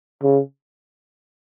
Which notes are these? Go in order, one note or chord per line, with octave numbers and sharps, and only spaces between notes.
C#3